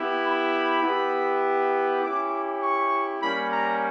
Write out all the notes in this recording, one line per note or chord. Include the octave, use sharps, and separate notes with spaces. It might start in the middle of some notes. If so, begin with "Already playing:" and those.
Already playing: B3 E4 G4
B5
B3 E4 G4
C#4 E4 G4 D6
C#6
G3 A#3 C#4 B5
A#5